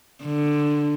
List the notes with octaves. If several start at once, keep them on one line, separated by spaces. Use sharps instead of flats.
D3